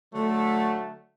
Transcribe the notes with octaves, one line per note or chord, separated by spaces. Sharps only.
D3 F#3 A3